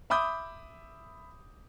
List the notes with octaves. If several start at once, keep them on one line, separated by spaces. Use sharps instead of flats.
E5 B5 D6 D#6 G6